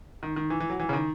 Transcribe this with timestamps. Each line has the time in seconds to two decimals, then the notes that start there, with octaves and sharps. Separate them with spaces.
0.23 D#3
0.36 D#3
0.50 E3
0.60 E3
0.70 F#3
0.80 E3
0.89 C#3
0.93 D#3